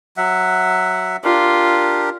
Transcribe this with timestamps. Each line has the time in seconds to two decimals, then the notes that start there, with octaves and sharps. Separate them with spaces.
0.17 F#3 E5 F#5
1.24 D4 F4 G4 A#4